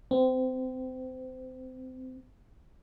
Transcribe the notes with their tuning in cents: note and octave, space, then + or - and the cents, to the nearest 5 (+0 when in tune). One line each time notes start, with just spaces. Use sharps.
C4 -25